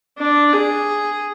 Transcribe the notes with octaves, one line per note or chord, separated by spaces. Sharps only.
D4
G#4